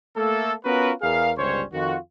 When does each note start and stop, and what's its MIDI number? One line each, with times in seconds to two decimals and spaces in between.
0.16 0.53 57
0.16 0.53 58
0.16 0.53 69
0.65 0.92 59
0.65 0.92 61
0.65 0.92 65
0.65 0.92 66
0.65 0.92 70
0.65 0.92 71
1.02 1.31 40
1.02 1.31 68
1.02 1.31 70
1.02 1.31 77
1.38 1.63 31
1.38 1.63 37
1.38 1.63 55
1.38 1.63 61
1.38 1.63 72
1.38 1.63 73
1.73 1.96 41
1.73 1.96 51
1.73 1.96 65
1.73 1.96 66